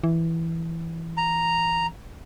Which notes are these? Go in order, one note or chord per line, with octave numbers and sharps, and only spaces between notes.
E3
A#5